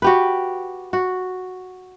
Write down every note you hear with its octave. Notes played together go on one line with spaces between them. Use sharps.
F#4 G4 B4
F#4